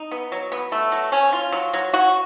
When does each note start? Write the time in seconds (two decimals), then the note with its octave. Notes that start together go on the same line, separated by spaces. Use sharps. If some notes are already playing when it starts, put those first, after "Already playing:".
Already playing: D#4
0.12 B3
0.32 F#3
0.52 B3
0.72 A3
0.92 F#3
1.12 C#4
1.33 F4
1.52 F#3
1.73 F#3
1.94 F#4